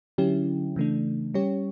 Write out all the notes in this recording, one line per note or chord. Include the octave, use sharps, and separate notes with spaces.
D3 F#3 C#4 E4 G4
C#3 E3 A3 D4
G3 C#4 G4 C#5